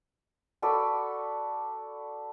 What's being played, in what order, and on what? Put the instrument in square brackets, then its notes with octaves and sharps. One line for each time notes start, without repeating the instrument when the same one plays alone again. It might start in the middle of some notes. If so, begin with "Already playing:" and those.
[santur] F#4 A4 B4 D5